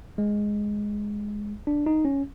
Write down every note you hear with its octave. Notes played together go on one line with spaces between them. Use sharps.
G#3
D4
D#4
C#4